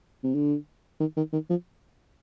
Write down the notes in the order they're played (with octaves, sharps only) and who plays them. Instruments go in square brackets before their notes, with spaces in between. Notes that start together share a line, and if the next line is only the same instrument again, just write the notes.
[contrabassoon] C3
D3
D#3
D#3
D#3
F3